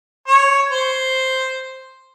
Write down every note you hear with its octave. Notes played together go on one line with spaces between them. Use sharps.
C#5
C5